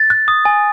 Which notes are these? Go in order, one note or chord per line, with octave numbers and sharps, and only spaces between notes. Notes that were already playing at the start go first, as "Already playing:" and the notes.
Already playing: A6
F#6
D#6
G#5